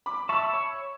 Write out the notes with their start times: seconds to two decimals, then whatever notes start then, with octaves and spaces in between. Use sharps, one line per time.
0.06 B5 D6
0.29 E5 A5 B5 C#6 E6
0.53 C#5